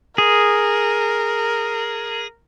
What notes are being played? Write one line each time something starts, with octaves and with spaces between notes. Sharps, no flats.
G#4 A#4